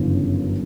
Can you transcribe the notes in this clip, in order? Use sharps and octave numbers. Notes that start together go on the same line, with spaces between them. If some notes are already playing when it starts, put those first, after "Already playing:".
Already playing: G1 F#2 C#3 E3